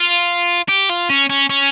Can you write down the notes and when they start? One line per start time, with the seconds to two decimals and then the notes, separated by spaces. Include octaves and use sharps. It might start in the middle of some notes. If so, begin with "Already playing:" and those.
Already playing: F4
0.69 G4
0.90 F4
1.10 C#4
1.30 C#4
1.50 C#4